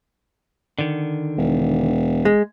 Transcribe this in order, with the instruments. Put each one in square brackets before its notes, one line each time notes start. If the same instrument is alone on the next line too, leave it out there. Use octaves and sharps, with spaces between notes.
[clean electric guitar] D3 D#3
[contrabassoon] E1
[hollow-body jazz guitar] G#3